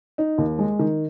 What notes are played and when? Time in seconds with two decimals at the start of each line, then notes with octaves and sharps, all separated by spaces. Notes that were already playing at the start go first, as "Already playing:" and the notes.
0.18 D#4
0.38 D#2
0.59 G#3
0.79 D#3